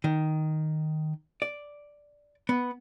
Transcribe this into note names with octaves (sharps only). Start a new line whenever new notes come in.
D#3
D5
B3